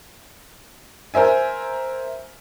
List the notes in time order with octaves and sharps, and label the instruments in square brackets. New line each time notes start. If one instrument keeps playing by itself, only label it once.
[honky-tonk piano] A#4 C5 E5 G#5